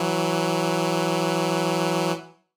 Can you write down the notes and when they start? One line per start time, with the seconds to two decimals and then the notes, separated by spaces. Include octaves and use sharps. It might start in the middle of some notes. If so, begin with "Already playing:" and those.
Already playing: E3 F#3